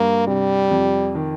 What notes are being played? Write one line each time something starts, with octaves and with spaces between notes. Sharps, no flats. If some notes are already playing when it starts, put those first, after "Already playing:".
Already playing: G2 A#3
C3 G3
F2
D#3